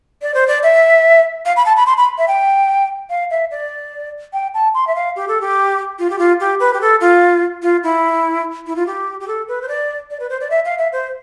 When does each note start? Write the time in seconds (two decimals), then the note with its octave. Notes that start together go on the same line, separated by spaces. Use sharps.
0.22 D5
0.34 C5
0.47 D5
0.63 E5
1.46 F5
1.57 B5
1.66 A5
1.77 B5
1.87 C6
1.97 B5
2.18 E5
2.28 G5
3.10 F5
3.30 E5
3.51 D5
4.33 G5
4.54 A5
4.74 C6
4.87 E5
4.95 F5
5.16 G4
5.28 A4
5.41 G4
5.99 F4
6.10 G4
6.19 F4
6.40 G4
6.60 B4
6.74 G4
6.81 A4
7.01 F4
7.62 F4
7.83 E4
8.67 E4
8.76 F4
8.87 G4
9.20 G4
9.28 A4
9.48 B4
9.62 C5
9.68 D5
10.10 D5
10.20 B4
10.30 C5
10.41 D5
10.50 E5
10.65 F5
10.78 E5
10.93 C5